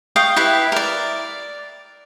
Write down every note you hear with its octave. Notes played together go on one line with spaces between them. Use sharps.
F5 G5 C#6 D#6
E4 G4 B4 E5
A#4 D5